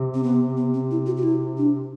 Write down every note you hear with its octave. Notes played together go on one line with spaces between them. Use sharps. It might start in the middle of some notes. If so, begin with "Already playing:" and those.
Already playing: C3
C4
B3
B3
C4
E4
F#4
F#4
E4
D4